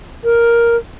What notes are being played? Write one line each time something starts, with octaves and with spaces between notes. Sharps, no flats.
A#4